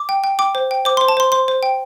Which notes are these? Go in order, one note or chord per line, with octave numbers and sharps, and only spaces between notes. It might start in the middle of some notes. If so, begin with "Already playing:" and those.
Already playing: D6
G5
G5
G5 D6
C5
G5
C5 D6
C5 C6
A5
C5 C6
C5 C6
C5
G5